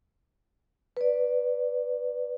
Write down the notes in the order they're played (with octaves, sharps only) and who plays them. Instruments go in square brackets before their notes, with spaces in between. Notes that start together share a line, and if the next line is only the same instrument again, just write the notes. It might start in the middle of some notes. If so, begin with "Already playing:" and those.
[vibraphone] B4 D5